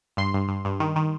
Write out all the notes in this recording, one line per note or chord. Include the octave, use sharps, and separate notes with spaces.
G2 C6
G2
G2
G2
D#3
D#3